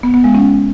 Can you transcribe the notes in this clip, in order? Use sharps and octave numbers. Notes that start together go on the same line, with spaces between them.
B3
B3
G#3
C#4